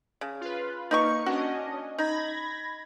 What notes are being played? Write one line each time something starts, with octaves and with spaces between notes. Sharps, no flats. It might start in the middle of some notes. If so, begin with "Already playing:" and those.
C#3
F4 B4
A#3 D#4 B4 C#6 C#7
C#4 D4 F#4 D#5
D#4 B5 G#6 A#6